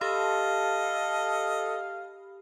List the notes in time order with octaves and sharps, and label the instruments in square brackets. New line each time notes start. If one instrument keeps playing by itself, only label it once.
[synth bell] G4 B5 [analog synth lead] A4 [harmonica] D#5 [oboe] F5